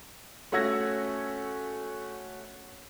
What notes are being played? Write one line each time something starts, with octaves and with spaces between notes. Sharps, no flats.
A3 C#4 F#4 E6 G#6 A#6